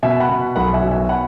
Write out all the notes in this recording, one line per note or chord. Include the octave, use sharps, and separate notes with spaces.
B2 E5 G#5
F#5 B5
B2
B1 F#5 B5
E5 G#5
B2
E5 G#5
F#5 B5